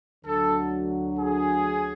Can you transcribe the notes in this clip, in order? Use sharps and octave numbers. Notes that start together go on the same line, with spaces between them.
D2 D3 F#3 A4
G#4